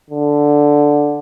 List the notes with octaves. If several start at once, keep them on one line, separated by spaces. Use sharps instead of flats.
D3